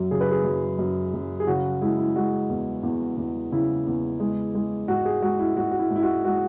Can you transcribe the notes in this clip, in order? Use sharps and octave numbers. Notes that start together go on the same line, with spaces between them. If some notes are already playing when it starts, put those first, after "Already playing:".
Already playing: F#2 F#3
C#3 G#4
B4
G#4
F#2
F#2
F#2
G#4
C#3 F#4
G#3 E4
E4
G#3 F#4
E2
E2
E2
C#3 E4
E2
G#3
G#3
G#2 F#4
G#4
G#3 F#4
E4
G#2 F#4
F#4
E4
G#2
E4
F#4
G#3 F#4